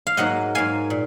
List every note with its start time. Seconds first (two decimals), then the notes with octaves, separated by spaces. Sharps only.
0.07 F5
0.17 G#2 F#3 A#3 D#5 F#5
0.55 G#2 F#3 A#3 F5 G#5
0.90 A#2